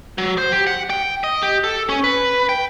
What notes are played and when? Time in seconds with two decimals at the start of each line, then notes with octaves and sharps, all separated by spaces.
0.18 F#3
0.38 C5
0.52 G4
0.67 F#5
0.90 G5
1.24 D#5
1.43 G4
1.64 A4
1.89 C#4
2.04 B4
2.49 G5